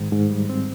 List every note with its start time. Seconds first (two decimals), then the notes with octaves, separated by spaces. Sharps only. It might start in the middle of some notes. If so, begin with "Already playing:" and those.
Already playing: G#2 D#3
0.12 G#2
0.30 G3
0.49 C4